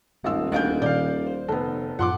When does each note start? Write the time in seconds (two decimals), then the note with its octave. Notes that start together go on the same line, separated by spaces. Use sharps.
0.24 D#1 G#1 F4 F#5 E6
0.52 D2 D#5 F5 F#6 G6 A6 D7
0.82 A#2 D#3 D5 F5 G6
1.27 C5
1.48 F1 B3 A4
1.99 F#2 A2 F3 F#5 C6 D6